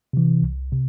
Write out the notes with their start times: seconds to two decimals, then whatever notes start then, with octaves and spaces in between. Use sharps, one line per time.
0.13 C3 E3
0.42 C2
0.72 C3